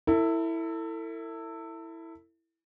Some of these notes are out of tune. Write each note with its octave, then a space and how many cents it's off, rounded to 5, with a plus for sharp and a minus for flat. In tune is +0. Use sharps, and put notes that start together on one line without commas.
E4 +0 A4 +40